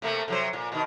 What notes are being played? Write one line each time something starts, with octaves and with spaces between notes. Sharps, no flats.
C3 A3 A#3
C3 F#3 C5
A#2
B2 D#3